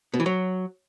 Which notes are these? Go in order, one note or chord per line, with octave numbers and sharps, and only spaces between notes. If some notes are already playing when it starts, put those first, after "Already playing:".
B2
E3
F#3